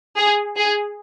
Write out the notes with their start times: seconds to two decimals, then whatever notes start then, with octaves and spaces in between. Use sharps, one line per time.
0.17 G#4
0.56 G#4